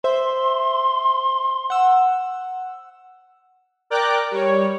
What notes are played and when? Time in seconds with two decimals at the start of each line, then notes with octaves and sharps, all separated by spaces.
0.04 C5 E5 C6
1.70 F#5 E6
3.90 A#4 D5 G5 A#5 D6 F#6
4.31 G3 C#5